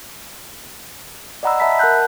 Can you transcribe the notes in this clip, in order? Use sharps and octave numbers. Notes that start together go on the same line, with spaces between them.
D5 D#5 F#5 A#5 B5 E6
E5 A5 B5 B6
A#4 F#5 A5 F#6 G6